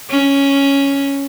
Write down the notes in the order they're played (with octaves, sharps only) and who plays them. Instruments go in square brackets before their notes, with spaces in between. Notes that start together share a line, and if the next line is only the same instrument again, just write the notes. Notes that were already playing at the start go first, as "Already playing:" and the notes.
[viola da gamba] C#4